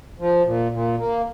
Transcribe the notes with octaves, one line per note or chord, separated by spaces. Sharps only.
F3
A#2
A#2
A#3